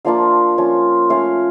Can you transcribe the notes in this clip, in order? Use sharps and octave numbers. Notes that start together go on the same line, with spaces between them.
F3 A#3 D4 F4 F5
F3 C#4 F4
A3 C#4 F4 F5